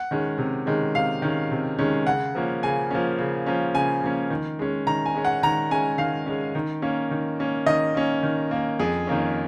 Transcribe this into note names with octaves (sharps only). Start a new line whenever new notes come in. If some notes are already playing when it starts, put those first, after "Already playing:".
Already playing: F#5
D#3 G#3 C#4
C3
D#3 G#3 C#4
C3 F5
D#3 G#3 C#4
C3
D#3 G#3 C#4
C#3 F#5
F3 A#3 C#4
C#3 G#5
F3 A#3 C#4
C#3
F3 A#3 C#4
C#3 G#5
F3 A#3 C#4
D#3
G#3 C#4
D#3 A#5
G#5
G#3 C#4
F#5
D#3 A#5
G#3 C#4 G#5
D#3 F5
G#3 C#4
D#3
A#3 C#4
D#3
A#3 C#4
D#3 D#5
A#3 C#4
D#3
A#3 C#4
F2 G#4
D#3 A#3 C#4